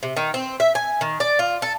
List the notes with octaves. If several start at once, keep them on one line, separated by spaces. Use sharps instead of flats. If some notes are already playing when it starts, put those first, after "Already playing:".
C3
D#3
C4
E5
G#5
D#3
D5
F4
A4